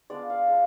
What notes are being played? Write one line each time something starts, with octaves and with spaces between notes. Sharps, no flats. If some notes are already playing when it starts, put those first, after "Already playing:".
G#3 B3 D4 F4 D5
F5
G#3 D4 F4